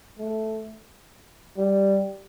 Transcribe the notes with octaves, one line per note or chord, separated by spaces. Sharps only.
A3
G3